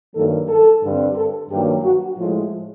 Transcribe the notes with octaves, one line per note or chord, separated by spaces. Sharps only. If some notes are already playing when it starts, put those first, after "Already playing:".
G2 D#3 F#3 A#3 A4
A4
G2 D3 G3 C4
A4
G2 D#3 F#3 A#3 G4
F#4
A2 F3 G#3 F4